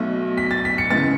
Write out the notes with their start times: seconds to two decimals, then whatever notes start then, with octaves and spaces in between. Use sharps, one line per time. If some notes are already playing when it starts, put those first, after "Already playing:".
Already playing: B1 B2 A3
0.38 B6
0.51 A6
0.65 B6
0.78 C#7
0.91 E2 C#3 G#3 B3 A6